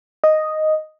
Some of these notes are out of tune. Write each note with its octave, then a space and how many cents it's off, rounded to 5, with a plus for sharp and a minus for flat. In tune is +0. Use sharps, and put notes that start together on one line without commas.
D#5 +0